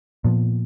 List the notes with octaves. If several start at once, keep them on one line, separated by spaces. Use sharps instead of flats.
A#2 F3 B3